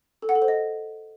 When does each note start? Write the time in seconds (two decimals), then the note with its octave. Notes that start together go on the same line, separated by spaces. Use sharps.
0.22 A4
0.29 F#5
0.35 A4
0.42 C5
0.48 D#5